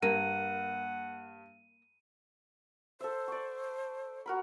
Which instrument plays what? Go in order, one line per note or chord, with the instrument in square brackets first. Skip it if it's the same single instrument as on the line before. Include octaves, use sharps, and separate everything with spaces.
[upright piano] G2 [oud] A#3 [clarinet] F#5 [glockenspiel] D#7
[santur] A4 E5 [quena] C5
[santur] D5 C#6
F#4 A#4 B5